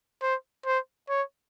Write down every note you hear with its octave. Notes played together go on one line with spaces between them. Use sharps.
C5
C5
C#5